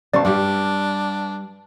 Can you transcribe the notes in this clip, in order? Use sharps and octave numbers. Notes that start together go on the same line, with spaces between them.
B1 C#4 C5 D5 A5 C#6
G2 G3 D4 G4